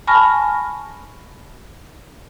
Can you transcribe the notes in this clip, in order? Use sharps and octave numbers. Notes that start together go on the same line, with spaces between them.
G#5 A5 B5 C#6 F6 A#6